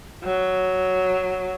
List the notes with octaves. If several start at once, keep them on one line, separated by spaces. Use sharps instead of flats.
F#3